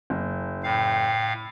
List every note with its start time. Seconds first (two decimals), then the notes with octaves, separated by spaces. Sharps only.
0.10 F#1
0.64 A2 F5 G5